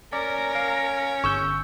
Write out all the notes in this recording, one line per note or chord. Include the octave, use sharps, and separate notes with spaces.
C#4 A#4 D5
F5
G1 C#6 E6 G6